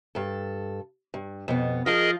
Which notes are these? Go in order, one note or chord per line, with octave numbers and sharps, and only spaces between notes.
G2 A4
G2
F2 B2 B3
F3 F4 G#4 A#4 D#5